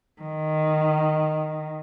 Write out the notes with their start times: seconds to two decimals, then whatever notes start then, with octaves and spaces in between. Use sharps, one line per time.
0.22 D#3